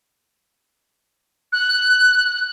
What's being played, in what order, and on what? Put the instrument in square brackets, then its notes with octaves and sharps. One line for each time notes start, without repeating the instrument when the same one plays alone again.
[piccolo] F#6